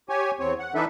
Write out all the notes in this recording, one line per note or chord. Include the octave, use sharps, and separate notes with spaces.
G4 C#5 G#5
E2 C4 C#5
F#5
E3 D4 D#4 A4 B4 E5